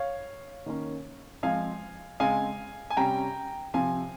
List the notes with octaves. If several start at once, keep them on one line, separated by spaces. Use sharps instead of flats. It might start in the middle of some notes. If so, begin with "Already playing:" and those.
Already playing: C#5 F5
D#3 A#3 C#4
F3 G#3 C4 F5 G#5
C#3 G#3 C4 F5 G#5
G#5
C3 G3 C#4 G5 A#5
C3 F3 C4 F5 G#5